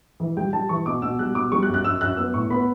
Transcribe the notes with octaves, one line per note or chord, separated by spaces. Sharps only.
E3
G3 G5
G3 A5
E3 C#6
B2 D6
B2 E6
G3 F#6
B2 D6
G3 C#6
F#6
F#2
F#6
F#2 E6
F#2 F#6
B3 E6
A2 C#6
B3 B5